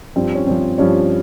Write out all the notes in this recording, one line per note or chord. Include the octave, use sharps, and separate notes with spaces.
G2 F3 C4
C#4
G2 F3 C4
G2 F3 C#4